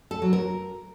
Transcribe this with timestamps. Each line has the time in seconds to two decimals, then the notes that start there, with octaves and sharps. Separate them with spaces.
0.11 A4
0.22 F#3
0.33 A#4